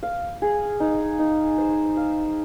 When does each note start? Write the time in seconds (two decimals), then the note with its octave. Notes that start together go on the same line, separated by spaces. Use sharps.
0.03 F5
0.42 G#4
0.80 D#4
1.19 D#4
1.58 C5
1.97 F5